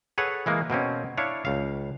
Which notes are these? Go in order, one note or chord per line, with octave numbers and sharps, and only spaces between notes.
G#4 A4 B4 C#5 F#5
E3 G#3 A#3
B2 A#3 C4 C#4
D4 E4 C#5 F5
C#2 F5